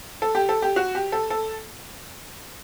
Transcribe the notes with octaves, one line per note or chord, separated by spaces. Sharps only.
A4
G4
A4
G4
F#4
G4
A4
A4